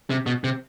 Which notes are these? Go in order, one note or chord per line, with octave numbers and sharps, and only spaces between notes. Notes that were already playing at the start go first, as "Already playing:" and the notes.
C3
B2
C3